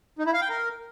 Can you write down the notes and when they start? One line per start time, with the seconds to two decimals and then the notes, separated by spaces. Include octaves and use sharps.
0.19 D#4
0.26 E4
0.34 F5
0.41 G5
0.49 A#4